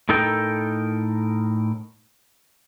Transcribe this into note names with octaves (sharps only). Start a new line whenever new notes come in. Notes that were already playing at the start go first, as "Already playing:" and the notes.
A2 D#4 A4 A#4 G5